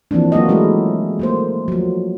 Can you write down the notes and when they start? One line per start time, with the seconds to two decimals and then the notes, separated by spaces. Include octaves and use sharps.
0.11 E3 F3 A#3 C4 D4
0.32 F#3 A#3 F4 F#4 D#5
0.49 G#3 A3 C#4 E4
1.20 A3 A#3 C5
1.68 F3 F#3